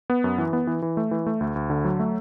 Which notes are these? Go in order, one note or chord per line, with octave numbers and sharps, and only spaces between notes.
B3
F#2
E3
B3
E3
E3
A3
E3
A3
D2
D2
D3
F#3
A3